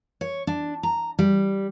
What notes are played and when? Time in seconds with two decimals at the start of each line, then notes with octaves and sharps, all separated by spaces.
0.21 C#5
0.47 D4
0.83 A#5
1.19 G3